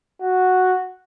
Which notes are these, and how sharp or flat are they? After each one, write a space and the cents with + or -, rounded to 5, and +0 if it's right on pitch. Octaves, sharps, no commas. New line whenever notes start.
F#4 -5